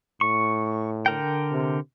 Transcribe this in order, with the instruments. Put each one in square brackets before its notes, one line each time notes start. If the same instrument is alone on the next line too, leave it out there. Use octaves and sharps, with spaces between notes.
[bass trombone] A2 [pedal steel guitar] C#6
[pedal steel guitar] D3 A#4 G5
[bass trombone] C3